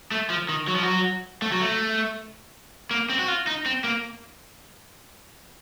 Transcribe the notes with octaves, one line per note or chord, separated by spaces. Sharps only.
A3
F3
D#3
F#3
F3
F#3
A3
F#3
A3
A#3
C4
F#4
F4
D#4
C4
A#3